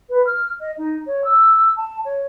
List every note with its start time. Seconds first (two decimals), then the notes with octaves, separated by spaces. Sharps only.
0.09 B4
0.26 F6
0.60 D#5
0.77 D#4
1.06 C#5
1.24 E6
1.76 A5
2.05 C#5